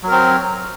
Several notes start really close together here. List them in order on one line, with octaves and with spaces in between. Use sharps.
F#3 A#4 C4